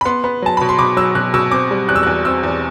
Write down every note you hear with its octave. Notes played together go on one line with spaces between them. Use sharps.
B5
B3 C6
B3
F#3 A5
B2 B5
C6
B2 D6
F#3 E6
B2 F#6
B2 E6
C4 D6
G3
E2 F#6
E6
E2 F#6
C4 E6
E2